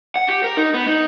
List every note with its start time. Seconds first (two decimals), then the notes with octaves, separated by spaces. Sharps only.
0.16 F#5
0.29 G4
0.44 A#4
0.57 D#4
0.74 B3
0.87 D#4